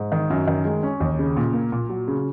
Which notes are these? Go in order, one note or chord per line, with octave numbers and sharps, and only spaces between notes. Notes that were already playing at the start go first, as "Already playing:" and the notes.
Already playing: G#2
D#3
F#2
D#3
G#3
C#4
D#2
C#3
A#2
A#3
A#2
F#3
C#3